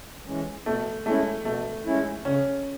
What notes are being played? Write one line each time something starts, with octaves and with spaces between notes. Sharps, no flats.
E3 G#3 C#4
B2 A3
G#3 A3 C#4 E4
B2 A3
G#3 C#4 E4
C#3 C#4